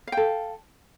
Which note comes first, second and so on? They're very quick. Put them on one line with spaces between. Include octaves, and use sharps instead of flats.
F5 G5 A4